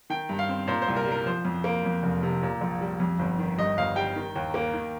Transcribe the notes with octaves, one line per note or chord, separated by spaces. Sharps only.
D#3 G5
G2
F5
C4
A#2 C5
C5
C2
A#4
G3
A#4
F3 C5
F2
A#3
F2
F1
C3
A#2
A#1
G3
F2
G1
D#3
G2 D#5
G1 F5
G3 G5
D#3
D#2
A#3
D#3